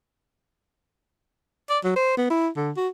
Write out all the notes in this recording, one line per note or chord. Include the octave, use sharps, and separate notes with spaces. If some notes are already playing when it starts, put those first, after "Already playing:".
D5
F#3
C5
B3
E4
D3
F#4